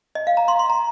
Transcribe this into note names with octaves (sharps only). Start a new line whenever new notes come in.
D#5
F5
A#5
C6
C6
A#5